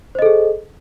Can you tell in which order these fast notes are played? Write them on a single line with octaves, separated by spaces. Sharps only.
C5 D#5 A4 G#4